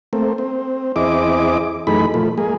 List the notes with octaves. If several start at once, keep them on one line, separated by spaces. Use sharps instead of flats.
A3 A#3 C4
C4
E2 C4 E4 G#4 D#5 D6
F#2 E3 A3 D#4 G#4 B5
A#2 F3 A3
G#3 A#3 G#4